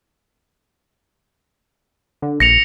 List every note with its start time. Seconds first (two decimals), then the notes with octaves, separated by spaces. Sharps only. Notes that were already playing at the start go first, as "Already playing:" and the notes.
2.22 D3
2.40 A#1 A#6 C#7 F7